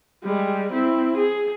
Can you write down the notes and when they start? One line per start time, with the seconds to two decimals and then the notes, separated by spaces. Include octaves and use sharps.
0.23 G3 G#3
0.72 C4 E4
1.17 G#4